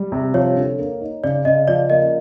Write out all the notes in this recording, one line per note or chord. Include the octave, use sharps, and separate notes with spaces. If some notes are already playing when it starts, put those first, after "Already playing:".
Already playing: G3
C3
F3 C#5
D3
A#3
D#4
C#3 D5
C#3 D#5
F3 D5
A#3 D#5